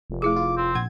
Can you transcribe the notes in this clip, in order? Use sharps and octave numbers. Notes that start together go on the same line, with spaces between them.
F1
A3 E4 G#4 D6
F4
C4
A#1 F#5 G#6